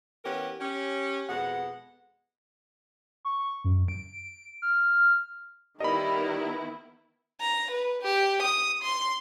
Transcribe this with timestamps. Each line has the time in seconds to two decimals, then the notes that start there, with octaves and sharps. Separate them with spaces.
0.25 E3 B3 C#4 G4 A#4 B4
0.60 C#4 G4
1.29 F2 B2 G#3 B3 F#5
3.25 C#6
3.64 F#2
3.88 D7
4.62 F6
5.80 D#3 G3 B3 E4 A#4 D#5 B5
7.41 A#5
7.71 B4
8.03 G4
8.43 D#6
8.83 C6